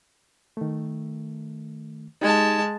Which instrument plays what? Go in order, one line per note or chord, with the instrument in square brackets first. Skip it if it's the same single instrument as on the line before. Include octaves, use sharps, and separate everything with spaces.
[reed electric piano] D#3 A3
[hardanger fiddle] G#3 A5 [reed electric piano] D#4 G4 G#6